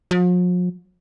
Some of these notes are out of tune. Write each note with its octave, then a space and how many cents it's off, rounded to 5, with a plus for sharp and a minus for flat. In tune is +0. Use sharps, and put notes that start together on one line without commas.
F3 +45